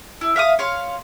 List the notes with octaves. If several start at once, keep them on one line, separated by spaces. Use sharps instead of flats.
E4
E5 F5 D6 D#6
C#5 F5 C6